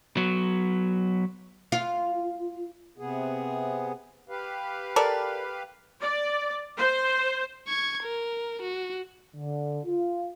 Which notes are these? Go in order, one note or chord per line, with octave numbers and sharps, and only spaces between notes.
F#3 B3
F4
C3 B3 G#4
G4 B4 F5
A4 A#4 D5
D5
C5
C#6 G#6
A#4
F#4
D3
F4